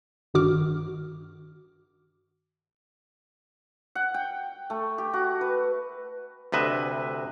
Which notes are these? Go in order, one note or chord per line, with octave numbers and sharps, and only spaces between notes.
G#1 G2 D#3 F#4 D6 F6
F#5
G5
A3
G4
F#4
B4
D2 C3 B4 D#5 E5